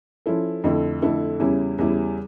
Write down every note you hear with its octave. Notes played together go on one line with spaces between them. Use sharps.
F3 C#4 E4 A4
F2 D3 A3 E4 A4
F2 D3 A3 E4 A4
E2 C#3 G3 C#4 E4
E2 C#3 G3 C#4 E4